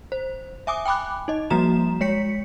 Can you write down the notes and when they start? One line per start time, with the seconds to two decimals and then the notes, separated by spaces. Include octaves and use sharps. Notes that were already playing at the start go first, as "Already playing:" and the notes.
0.12 C5
0.67 E5 G#5 D6 D#6
0.86 G5 G#5 B5 D6 F#6
1.28 D#4 D#5
1.50 F3 G3 A#3 F#4 A#5 E7
2.01 G#3 C#5 B6 C#7